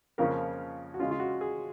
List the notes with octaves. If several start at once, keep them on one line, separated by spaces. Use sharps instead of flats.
F2 C#3 F3 A#3 C#4 A#4
F#4
C#3 G#3 C#4 F4
F4
F#4
G#4